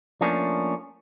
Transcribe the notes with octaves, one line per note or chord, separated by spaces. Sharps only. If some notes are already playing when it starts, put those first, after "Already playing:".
F3 A3 A#3 C#4 D4